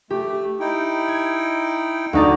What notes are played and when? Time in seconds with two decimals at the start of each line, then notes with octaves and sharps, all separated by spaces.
0.10 A3 G4
0.60 D#4 E4 G5
1.08 G#6
2.13 D2 D#4 D5